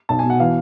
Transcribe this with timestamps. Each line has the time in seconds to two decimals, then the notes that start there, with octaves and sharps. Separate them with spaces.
0.09 B1 A5
0.19 B2 G#5
0.30 F#5
0.39 E3 F5